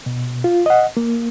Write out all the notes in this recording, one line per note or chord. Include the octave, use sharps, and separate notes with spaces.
B2
F4
D#5 F#5
A#3